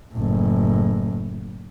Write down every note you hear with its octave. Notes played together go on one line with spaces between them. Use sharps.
F#1 A2